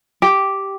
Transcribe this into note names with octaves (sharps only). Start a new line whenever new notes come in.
G4